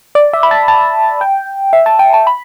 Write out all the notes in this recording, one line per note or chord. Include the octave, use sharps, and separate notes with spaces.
D5
E5
B5
A5
A5
G5
E5
A5
G5
A5
B5